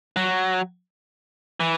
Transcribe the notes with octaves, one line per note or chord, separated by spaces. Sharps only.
F#3
E3